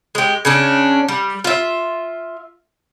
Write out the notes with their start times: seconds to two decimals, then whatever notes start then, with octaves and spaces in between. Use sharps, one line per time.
0.15 G#3 G4
0.45 C#3 C#4 D4
1.08 G3
1.44 F4 E5